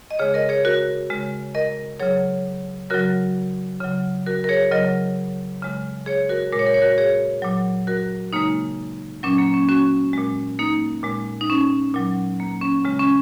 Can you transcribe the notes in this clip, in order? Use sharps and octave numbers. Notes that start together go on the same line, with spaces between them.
D#5
C#3 G#3 G#4 C#5
A#4 D#5
G#4 C#5
F#4 A#4
C#3 G#3
A#4 D#5
C#3 F#3 G#4 C#5
C#3 F#3 F#4 A#4
C#3 F#3
F#4 A#4
A#4
G#4 C#5
C#3 F#3 A#4 D#5
C#3 G#3
G#4 C#5
F#4 A#4
A#2 G#3 A#4
C#5
A#4
C#5
F#4 A#4
G#4 C#5
A#2 F#3
F#4 A#4
C#3 G#3 A#3 D#4
A#2 F#3 C#4
A#3
C#4
C#4 F#4
A#2 G#3
A#3 D#4
A#2 G#3
D#4
C#4
A#2 F#3
A#3
C#4
C#3 G#3
C#4